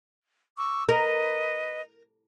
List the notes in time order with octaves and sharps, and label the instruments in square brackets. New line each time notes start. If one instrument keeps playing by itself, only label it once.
[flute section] C#6 D6 E6
[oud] A#4 [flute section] B4 D#5